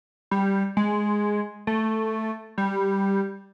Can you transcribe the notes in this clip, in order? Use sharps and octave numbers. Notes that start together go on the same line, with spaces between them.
G3
G#3
A3
G3